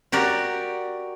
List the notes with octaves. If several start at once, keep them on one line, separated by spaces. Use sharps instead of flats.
F#4 G4 A#4 D5